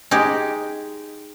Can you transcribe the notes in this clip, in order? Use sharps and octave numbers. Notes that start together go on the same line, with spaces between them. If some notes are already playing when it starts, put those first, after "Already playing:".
G#3 D#4 G4